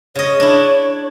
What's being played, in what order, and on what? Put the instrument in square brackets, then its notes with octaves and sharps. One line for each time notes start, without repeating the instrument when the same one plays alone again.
[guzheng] C#3 D#5 [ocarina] C#5
[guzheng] D4 E4